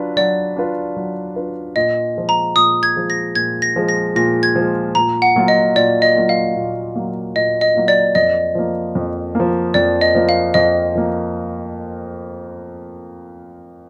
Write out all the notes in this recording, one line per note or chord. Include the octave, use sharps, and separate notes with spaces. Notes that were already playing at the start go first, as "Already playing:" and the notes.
Already playing: F#3 D4 F4 B4
F#3 D5
D4 F4 B4
F#3
D4 F4 B4
A#2 D#5
F3 G#3
A#5
A#2 D#6
G#6
F3 G#3
A#6
A#2 G#6
A#6
F3 G#3
A#6
A#2 A#6
G#6
F3 G#3
A#2 A#5
F#5
F#3 A#3 F4
D#5
A#2 D5
D#5
F#3 A#3 F4
F5
A#2
F#3 A#3 F4
A#2 D#5
D#5
F#3 A#3 F4
D5
F2 D#5
F3 A#3
F2
F3 A#3
F2 D5
D#5
F3 A#3
F5
F2 D#5
F3 A#3